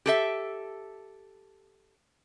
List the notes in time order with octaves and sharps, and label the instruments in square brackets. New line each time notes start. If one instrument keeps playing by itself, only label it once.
[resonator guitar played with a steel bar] G4 A4 E5